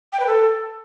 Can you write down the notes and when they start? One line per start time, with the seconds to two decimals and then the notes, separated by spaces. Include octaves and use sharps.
0.13 G5
0.20 B4
0.27 A4